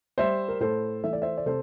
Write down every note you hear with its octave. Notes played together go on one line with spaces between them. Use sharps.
G3 C5 E5
A#4
A2 A4 C5
E3 A3 E5
D5
C5 E5
D5
C3 A4 C5